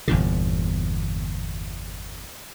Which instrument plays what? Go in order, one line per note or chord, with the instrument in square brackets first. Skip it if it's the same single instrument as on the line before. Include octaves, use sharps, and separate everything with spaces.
[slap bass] G1 E2 A#2 D3